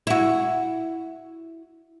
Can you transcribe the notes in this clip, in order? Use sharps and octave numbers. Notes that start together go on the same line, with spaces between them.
E4 F#4